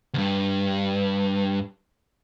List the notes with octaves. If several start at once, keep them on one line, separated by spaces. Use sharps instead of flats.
D2 G2